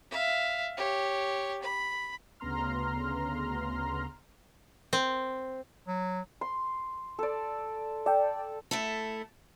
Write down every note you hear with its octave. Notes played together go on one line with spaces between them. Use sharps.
E5 F5
G4 C#5
B5
D2 C#3 B3 A#5 C6 F6
C4
F#3
C6
A4 D5
A4 D5 G5
A3 E4 A4